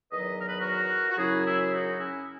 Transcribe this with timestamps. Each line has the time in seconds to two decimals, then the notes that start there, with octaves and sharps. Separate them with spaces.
0.12 E2 D#3 F#3 B4 D#5
0.39 A#4
0.48 B4
0.60 F#4 A#4
1.10 F#4
1.18 F#2 C#3 F#3 E4 G#4
1.44 E4 G#4
1.61 E4
1.72 D#4 F#4
1.98 C#4 E4